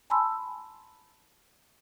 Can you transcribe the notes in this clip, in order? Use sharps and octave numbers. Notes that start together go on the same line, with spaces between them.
G#5 A5 B5 C6 E6